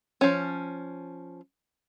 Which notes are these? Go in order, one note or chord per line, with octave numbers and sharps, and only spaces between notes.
F3 C#4